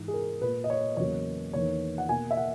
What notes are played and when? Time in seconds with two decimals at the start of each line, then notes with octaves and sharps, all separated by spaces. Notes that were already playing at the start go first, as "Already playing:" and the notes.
Already playing: G#2 E3 G#3
0.08 G#4
0.13 A#4
0.41 A#2 A#3 B4
0.64 D#5
0.70 C#5
0.97 E2 C#3 F#3 A#3 C#5
1.53 E2 D#3 A#3 C#5
1.98 F#5
2.08 B2 A#3 G#5
2.31 E5
2.37 F#5